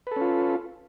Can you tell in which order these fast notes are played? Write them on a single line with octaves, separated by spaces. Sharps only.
B4 A4 C#4 F4